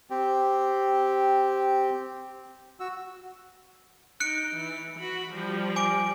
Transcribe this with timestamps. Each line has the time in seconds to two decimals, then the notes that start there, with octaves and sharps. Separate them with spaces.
0.10 C4 G4
2.80 F#4 E6
4.20 D#4 F#6 C#7 D7
4.55 E3
4.99 F#4 B5
5.34 F3 G3
5.76 G#5 D6 D7